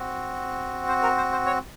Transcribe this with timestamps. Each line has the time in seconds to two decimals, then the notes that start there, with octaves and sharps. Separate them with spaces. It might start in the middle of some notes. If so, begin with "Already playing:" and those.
Already playing: C4 F#4
0.88 C5
1.03 A#4
1.17 C5
1.32 C5
1.46 C#5